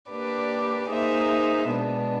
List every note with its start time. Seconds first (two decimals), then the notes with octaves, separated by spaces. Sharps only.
0.10 A#3 D4 G4 B4 D5
0.90 A#3 D#4 G#4 C5 E5
1.69 B2 G#3 B3 D4